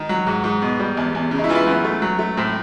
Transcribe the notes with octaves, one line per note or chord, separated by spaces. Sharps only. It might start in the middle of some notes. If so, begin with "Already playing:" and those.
Already playing: D#3
F#3
G#2 F#4
G#2
B2
G3
E2
E2
C#3
D#4
E4
E3 F4
E4
F#2 B3
A3
F#3
A3
A2 C4